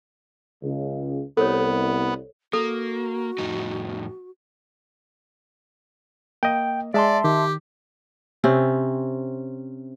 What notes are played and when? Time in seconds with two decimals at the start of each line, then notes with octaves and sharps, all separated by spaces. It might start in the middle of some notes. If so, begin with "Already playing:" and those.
0.62 C#2 C#3
1.37 C2 B3 A4 C5 C#5
2.53 A#3 F#4 A4
3.38 F2 A2 D#4
6.43 A#3 D#5 G5
6.94 G#3 D5 E5 A5 C6
7.24 D#3 G4
8.44 C3 C4 C#4